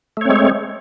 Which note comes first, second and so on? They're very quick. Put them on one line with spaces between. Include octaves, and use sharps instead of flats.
A3 C#5 C4 G#3